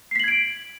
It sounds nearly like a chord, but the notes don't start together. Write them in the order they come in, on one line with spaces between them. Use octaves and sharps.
C7 B6 F#7 G#6 D7